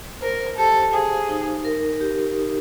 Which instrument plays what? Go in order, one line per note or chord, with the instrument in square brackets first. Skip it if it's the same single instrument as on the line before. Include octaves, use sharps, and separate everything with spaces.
[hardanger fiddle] A#4 [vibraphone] C5
[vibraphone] G4 [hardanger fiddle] A4
[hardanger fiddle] G#4 [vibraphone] F5
[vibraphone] D#4
A#4
G4
D#4